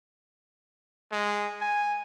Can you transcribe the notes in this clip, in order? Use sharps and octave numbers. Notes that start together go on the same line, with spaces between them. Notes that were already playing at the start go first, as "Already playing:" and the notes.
G#3
G#5